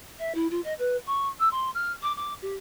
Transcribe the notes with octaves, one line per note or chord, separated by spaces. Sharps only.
E5
E4
F4
D#5
B4
C#6
E6
C6
F6
D6
D6
G4